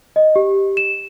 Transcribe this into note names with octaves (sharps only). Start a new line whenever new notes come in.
D#5
G4
E7